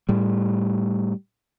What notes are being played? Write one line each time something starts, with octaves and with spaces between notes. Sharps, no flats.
A2 G3